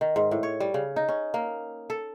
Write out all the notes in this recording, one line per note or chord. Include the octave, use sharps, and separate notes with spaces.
D#3
G#2
A2
C#5
G3
C#3
D#4
C#4
A#3
A4